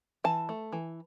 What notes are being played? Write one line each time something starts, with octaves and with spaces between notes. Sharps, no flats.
E3 A5
A3
E3